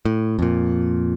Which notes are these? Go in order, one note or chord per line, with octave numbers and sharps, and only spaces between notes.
A2
F2 A#2